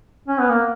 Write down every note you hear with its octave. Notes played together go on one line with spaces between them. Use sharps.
C#4
B3
A#3